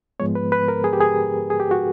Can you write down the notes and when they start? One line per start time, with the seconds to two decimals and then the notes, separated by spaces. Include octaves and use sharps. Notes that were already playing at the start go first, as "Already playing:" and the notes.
0.20 G#2 F3 G#3 B3 C#5
0.35 B4
0.52 B4
0.68 A#4
0.84 G#4
0.93 G4
1.00 G#4
1.50 G#4
1.60 G4
1.71 F#4